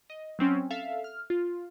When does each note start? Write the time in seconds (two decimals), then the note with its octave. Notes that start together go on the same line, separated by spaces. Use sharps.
0.10 D#5
0.39 F#3 C4 C#4
0.71 A4 E5 F5
1.04 F6
1.30 F4